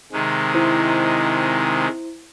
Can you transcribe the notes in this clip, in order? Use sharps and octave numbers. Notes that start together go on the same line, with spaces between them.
C3 D#3 G#3
E4 C5